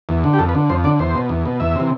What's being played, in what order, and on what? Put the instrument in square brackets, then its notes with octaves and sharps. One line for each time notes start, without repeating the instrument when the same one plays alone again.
[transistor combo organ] E2
D3
G4
F2 A4
B4
D3
F2 C5
D3 D5
E2 C5
B2
E2
B2
E2 E5
C3 E3